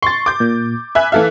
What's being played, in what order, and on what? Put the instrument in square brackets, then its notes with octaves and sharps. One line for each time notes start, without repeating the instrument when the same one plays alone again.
[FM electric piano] C6 [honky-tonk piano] C#6 A6
[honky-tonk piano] D6 G6
[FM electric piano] A#2
[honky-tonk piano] E5 G#5 F#6 [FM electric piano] B5
[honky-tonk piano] E3 A4 E5 [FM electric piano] F5